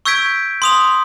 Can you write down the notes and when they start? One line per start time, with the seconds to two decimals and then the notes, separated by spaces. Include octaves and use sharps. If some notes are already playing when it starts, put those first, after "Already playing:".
0.05 C#6 E6 G6 G#6 B6 D7
0.62 C6 D#6 F7